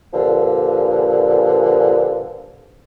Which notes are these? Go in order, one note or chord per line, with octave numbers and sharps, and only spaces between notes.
G2 A#2 D3 F3